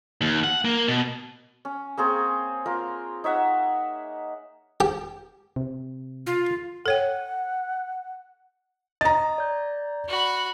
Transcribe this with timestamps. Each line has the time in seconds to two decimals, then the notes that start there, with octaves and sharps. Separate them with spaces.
0.21 D#2
0.44 F#5
0.65 A#3
0.88 B2
1.65 C#4
1.97 A#3 C4 G#4 C#5
2.66 A#3 F4 A#4
3.24 D#4 C#5 E5 F#5
4.80 G4
5.56 C3
6.26 F4
6.86 A4 C#5 F#5 G5
9.01 D#5 A#5 A6
9.38 D5 G6
10.08 F#4 B5